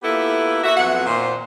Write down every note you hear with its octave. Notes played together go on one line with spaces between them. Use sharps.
A#3 B3 E4 F4 G4 A4
F#4 E5
F2 F#3 B3 F#5
A#2 D#3 C5